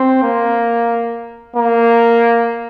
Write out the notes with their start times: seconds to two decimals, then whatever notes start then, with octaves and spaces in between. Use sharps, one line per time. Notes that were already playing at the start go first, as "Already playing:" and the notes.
Already playing: C4
0.23 A#3
1.56 A#3